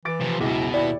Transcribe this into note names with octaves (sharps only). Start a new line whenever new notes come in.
E3 D6 A6 D7
F2 C3
C#2 F#2 B2 E4 G#4
D#2 E4 D5 G5